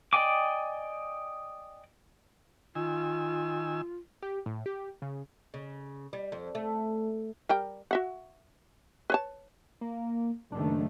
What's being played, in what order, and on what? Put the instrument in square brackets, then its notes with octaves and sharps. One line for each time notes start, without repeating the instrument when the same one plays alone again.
[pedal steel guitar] D5 D#5 G5 G#5 D6
[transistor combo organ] D#3 G#5 E6 [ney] F4
[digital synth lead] G4
A2
G4
C#3
[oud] C#3
G3
F2
A3
[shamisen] G3 A#4 G5
F#4 E5 F#5
B4 C#5 A5
[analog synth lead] A#3
[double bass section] F#1 D#3 A3 [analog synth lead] D4